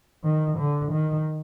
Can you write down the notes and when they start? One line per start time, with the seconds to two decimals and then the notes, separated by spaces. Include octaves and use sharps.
0.24 D#3
0.58 D3
0.92 D#3